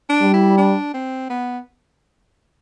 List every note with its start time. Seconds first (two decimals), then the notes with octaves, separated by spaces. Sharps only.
0.09 D4
0.21 G3
0.34 E4
0.58 D4
0.94 C4
1.30 B3